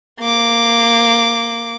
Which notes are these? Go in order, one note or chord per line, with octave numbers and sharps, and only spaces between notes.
A#3 D6